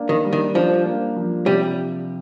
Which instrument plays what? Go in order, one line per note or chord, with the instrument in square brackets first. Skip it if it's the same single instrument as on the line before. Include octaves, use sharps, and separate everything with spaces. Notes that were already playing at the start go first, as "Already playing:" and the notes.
Already playing: [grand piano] A#3 D4
[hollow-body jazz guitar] D#3
[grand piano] G3
[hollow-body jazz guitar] D#3
[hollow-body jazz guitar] F3 [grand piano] D4
[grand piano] A#3
F3
[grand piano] C3 [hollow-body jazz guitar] G3